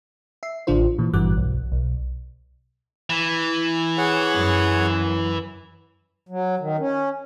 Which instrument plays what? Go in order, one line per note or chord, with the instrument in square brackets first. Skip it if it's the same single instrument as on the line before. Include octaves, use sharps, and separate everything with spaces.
[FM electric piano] E5 C7
A1 D3 D4 F4 C5
A#2 E3
G#1 G2 E3 F#4 D6 F#6
B1
B1
[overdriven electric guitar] E3
[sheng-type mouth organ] G#4 C#5 F#5
[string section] F#2
[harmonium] F#3
D#3
C#4